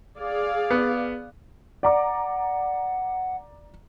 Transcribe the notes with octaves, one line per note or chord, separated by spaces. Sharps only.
G#4 D5 F5
B3
D5 F#5 A#5 D6